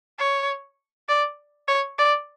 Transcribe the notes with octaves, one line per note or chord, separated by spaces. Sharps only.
C#5
D5
C#5
D5